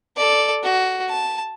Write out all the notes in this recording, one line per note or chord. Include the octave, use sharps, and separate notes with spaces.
A4 D5
F#4
A5